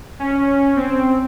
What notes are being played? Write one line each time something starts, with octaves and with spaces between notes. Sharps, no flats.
C#4
C4